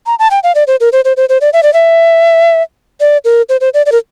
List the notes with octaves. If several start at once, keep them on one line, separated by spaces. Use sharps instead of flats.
A#5
A5
G5
F5
D5
C5
A#4
C5
C5
C5
C5
D5
E5
D5
E5
D5
A#4
C5
C5
D5
D5
A#4